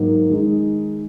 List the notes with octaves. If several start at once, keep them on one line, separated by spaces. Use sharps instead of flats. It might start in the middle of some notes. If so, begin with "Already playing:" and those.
Already playing: G#2 F#3 A#3 D#4
D#3 G#3 D#4